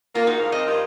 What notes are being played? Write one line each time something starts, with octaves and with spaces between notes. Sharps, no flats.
A#3 F4 A#4
G#3 A#3 D#4 F#4 A#4
D2 G#2 F5
F3 C4 D#4 D#5
G2 F4 G4